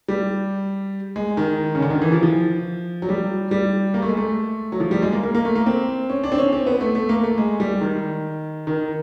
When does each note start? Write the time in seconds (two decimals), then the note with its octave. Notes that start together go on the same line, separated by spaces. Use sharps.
0.08 G3
1.16 G#3
1.37 D#3
1.75 C#3
1.82 D3
1.90 D#3
2.02 E3
2.12 F3
2.23 F3
3.02 F#3
3.09 G3
3.51 G3
3.94 A#3
4.02 A3
4.09 G#3
4.17 A3
4.72 F#3
4.80 F3
4.91 G3
5.02 G#3
5.13 A#3
5.23 A#3
5.35 A#3
5.45 A3
5.55 A#3
5.66 C4
6.10 C#4
6.24 D4
6.32 C4
6.38 C#4
6.53 C4
6.67 B3
6.81 A3
6.95 A3
7.09 A#3
7.23 A3
7.38 G#3
7.60 G3
7.81 D#3
8.67 D#3